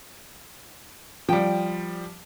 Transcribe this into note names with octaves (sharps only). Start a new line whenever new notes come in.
F3 G3 G5